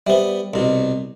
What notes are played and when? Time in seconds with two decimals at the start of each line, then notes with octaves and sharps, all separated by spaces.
0.07 G3 B3 C5 E5
0.54 C2 B2